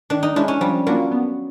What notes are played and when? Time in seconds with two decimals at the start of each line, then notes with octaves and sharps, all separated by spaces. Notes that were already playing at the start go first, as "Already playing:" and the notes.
0.10 D#3 D4
0.23 D#4
0.36 G#3 C#4 D4 E4
0.48 C#4
0.61 F3 G3
0.87 F#3 A#3 D4 F4 A#4
1.11 B3